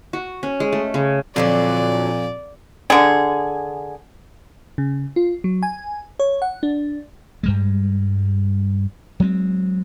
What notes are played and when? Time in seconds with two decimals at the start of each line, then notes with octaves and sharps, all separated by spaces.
0.13 F#4
0.43 C#4
0.60 G#3
0.73 A3
0.94 C#3
1.36 F2 A#2 D3 F3 F#3 D5
2.90 D3 G#4
4.78 C#3
5.16 F4
5.44 F#3
5.63 G#5
6.20 C#5
6.42 F#5
6.63 D4
7.43 G2 G3 G#3
9.20 F#3 G#3 B3 C4